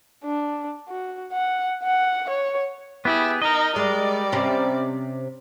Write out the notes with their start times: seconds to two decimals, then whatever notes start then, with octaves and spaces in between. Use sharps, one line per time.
0.24 D4
0.88 F#4
1.33 F#5
1.83 F#5
2.30 C#5
3.05 B3 E4 G4 G#4
3.42 D#4 A#4 D#5
3.76 G3 G#3 D5
4.32 C3 C4 C#4